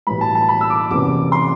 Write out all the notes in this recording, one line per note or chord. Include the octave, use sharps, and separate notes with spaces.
B1 A2 E3 G3 B5
A5
A5
B5
E6
D6
F#1 E2 C3 E3 D6
C6